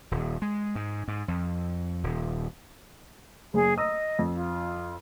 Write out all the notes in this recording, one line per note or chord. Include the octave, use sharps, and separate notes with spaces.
D#1
G#3
G#2
G#2
F2
D#1
F#1 G#4
D#5 A#5 D#6 E6
F2
F4